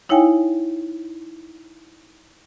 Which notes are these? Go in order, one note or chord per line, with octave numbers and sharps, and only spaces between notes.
D#4 E4 C#5 F5 G5 G#5